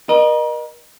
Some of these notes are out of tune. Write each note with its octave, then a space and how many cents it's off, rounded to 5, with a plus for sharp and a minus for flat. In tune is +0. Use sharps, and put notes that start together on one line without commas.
A#4 +40 D#5 -30